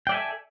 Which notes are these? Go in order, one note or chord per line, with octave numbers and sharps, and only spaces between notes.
A4 D5 E5 G5 G#5